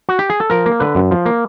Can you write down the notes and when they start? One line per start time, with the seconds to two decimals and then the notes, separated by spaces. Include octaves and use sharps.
0.09 F#4
0.19 G4
0.30 G#4
0.40 A4
0.50 F3 A#4
0.66 A#3
0.80 D3 B4
0.95 F#2
1.11 F3
1.26 A#3